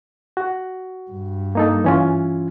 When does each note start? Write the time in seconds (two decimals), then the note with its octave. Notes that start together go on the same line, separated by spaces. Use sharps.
0.37 F#4
1.11 G2
1.55 A#3 D#4 A4
1.84 E3 C#4 F4